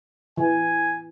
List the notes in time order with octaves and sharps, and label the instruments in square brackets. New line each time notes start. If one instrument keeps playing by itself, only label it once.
[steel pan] E3 [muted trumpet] G#5